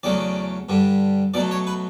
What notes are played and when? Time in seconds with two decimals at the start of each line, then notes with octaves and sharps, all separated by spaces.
0.03 E2 C#3 F#3 A3 D5
0.69 G2 D3 G3
1.34 B2 F#3 A3 D5
1.51 C#5
1.67 B4